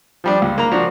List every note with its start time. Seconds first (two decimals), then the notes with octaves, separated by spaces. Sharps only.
0.24 F3 G3 D4
0.42 C#2
0.58 A#3 A#5
0.71 F3 D4 F#4